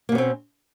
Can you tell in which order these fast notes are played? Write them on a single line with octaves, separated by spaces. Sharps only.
A#3 B2 C#4 C4